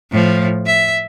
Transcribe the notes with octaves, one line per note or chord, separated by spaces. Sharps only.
A2 F3
E5